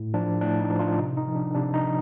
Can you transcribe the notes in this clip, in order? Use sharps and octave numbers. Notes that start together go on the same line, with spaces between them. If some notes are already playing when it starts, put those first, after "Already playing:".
Already playing: A2
F3 D4
A2 D4
D#4
F3
D4 F4
C3 D#4
D#4
F3
D4
C3 D4
D#4
F3